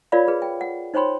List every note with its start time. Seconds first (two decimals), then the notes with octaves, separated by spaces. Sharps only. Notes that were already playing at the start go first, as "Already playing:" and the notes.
0.12 F4 A#4 C#5 D5 F5 B5
0.28 G#4 B4
0.42 G5
0.61 F#5
0.94 D#4 C5 C#5 G5 B5 C6